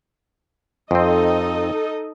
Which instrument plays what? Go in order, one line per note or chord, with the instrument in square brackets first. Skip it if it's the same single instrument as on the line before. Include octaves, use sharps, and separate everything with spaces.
[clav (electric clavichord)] F2 C4 [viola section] D#4 A4 D#5